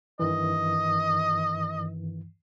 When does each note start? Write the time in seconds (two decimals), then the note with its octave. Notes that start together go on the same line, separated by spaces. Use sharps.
0.20 G2 D#3 E3 D#5